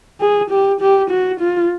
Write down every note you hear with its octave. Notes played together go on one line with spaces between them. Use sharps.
G#4
G4
G4
F#4
F4